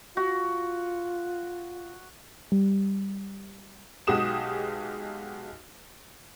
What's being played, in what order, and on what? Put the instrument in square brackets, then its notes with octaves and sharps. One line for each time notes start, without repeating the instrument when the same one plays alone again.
[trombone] F4 [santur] F#4
[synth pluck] G3
[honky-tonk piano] B1 G#3 F#4 G4 D#6 E7